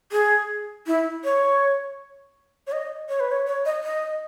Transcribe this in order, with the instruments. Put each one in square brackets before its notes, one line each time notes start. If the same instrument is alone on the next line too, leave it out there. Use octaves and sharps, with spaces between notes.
[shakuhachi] G#4
E4
C#5
C#5
D#5
C#5
B4
C#5
C#5
D#5
D#5